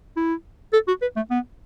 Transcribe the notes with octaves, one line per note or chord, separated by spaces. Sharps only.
E4
A4
F#4
B4
A3
B3